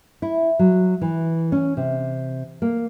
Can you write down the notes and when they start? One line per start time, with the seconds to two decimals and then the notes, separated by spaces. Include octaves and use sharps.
0.22 E4
0.59 F#3
1.01 E3
1.52 C#4
1.77 C3
2.62 A#3